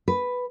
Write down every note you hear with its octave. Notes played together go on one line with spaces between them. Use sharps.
B4